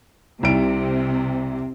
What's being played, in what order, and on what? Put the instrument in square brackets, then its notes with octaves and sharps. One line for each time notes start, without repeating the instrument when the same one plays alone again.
[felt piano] C2 D7 [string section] C3